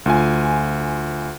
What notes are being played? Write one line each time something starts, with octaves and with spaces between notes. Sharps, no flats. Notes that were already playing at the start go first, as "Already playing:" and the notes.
D2 F4 G#5